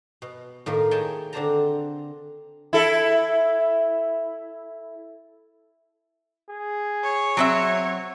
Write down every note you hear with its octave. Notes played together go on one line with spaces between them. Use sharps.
B2
A2 D#3 A#3
G#4 C#5 D#5 G5 A5
D3 C4 D4 C5 A5 A#5
E4 A4
G#4
C#5
F#3 C4 E5